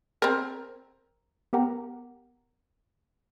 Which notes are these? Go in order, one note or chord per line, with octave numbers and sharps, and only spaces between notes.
C4 A#4
B3 G4 A#4 F#5 G5 A#5